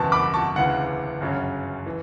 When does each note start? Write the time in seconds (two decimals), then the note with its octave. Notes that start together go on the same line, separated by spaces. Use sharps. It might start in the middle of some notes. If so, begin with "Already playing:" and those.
Already playing: F#1 E2 B2 A5 C#6
0.12 B5 D6
0.34 A5 C#6
0.55 E1 D2 C#3 E3 F#5
1.20 G1 F#2 C#3 F#3 C#4
1.86 E3